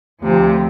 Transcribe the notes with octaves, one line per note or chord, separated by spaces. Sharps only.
D2 C3 F3